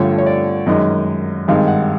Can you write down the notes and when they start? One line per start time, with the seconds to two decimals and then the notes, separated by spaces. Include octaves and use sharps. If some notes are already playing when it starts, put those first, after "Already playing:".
Already playing: G2 D3 F3 A3 C#5
0.18 C#5
0.26 D5
0.66 F#2 D#3 G#3 D#5
1.48 G#1 G2 D#3 G#3 F5
1.68 F#5